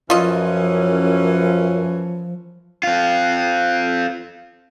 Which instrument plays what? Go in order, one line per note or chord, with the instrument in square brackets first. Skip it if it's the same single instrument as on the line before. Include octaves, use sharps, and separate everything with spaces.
[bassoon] F#2 [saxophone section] E3 C#4 [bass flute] F3 [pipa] F4 D#5
[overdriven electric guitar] C4 F4